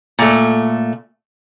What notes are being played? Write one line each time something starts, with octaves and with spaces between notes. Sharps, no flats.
A#2 A3